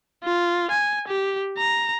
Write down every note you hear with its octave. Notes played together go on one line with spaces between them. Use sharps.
F4
G#5
G4
A#5